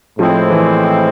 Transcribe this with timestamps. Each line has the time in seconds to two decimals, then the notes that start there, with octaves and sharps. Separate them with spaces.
0.19 A2 F3 G#3 C4 E4
0.50 E3